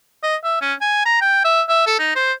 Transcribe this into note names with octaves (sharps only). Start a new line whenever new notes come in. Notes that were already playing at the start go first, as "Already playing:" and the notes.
D#5
E5
C#4
G#5
A#5
G5
E5
E5
A4
D#4
C5